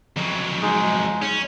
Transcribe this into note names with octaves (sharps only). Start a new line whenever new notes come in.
F2 F#3
G#3 D#4 G#4
C#4